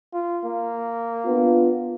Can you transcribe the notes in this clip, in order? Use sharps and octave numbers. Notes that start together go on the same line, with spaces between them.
F4
A#3
B3 D4 F4